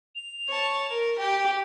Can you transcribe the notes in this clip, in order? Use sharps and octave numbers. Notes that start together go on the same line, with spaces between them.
F7
C#5 A5
A#4
G4 G5